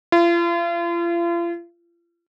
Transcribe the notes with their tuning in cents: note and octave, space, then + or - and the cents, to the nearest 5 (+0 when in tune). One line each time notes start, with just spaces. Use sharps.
F4 -40